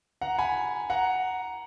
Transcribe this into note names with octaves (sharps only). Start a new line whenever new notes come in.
F#5 A#5
G#5 B5
F#5 A#5